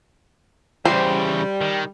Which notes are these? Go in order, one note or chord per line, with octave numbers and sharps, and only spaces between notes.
E2 C#3 G3 C5
D#3